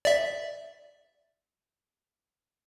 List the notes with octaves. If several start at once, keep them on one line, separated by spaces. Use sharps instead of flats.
D5 E5